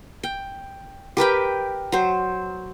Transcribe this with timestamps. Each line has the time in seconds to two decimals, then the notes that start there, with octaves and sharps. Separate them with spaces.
0.23 G5
1.17 G4 A#4 B4 G5
1.92 F#3 C5